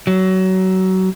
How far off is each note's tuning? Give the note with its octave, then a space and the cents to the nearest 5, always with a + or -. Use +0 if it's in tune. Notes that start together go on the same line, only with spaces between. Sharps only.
F#3 +25